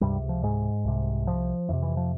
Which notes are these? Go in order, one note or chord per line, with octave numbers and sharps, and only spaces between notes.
C#2 G2 C3 G3
F3
G#2 G#3
C2 C3
F3
F2 C3 E3
E3
F3